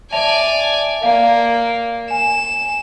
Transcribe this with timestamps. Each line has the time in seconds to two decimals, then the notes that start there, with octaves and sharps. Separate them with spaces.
0.12 D5 E5 G#5 A5 F7
1.03 A#3 D5 F5
2.10 G#5 E7